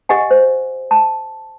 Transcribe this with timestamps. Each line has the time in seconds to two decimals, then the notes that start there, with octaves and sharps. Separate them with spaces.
0.09 G4 D#5 F#5 G#5
0.31 C5
0.91 A5